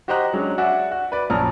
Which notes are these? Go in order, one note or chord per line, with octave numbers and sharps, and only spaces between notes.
F#4 G4 C5 D#5 A#5 F#6
F#3 G#3 C#4 D4
F#4 D5 E5 F#5 G#5
F#4
B4 D5
A#1 F#2 C#4 A5 A#5 F6